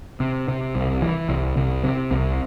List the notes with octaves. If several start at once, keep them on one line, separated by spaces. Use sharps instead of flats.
C3
C3
C2
E3
C2
C2
C3
C2